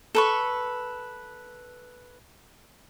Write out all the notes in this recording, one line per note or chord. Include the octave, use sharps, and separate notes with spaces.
A4 B4 C#6